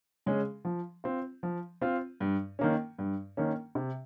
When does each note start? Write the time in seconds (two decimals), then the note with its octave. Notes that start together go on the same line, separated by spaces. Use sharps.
0.26 C#3 G#3 C#4 G#4
0.65 F3
1.04 C4 F4
1.43 F3
1.81 C4 F4
2.20 G2
2.59 D#3 A#3 C#4
2.98 G2
3.37 D#3 A#3 C#4
3.75 C3